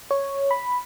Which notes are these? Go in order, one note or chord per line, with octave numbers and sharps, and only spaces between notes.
C#5
B5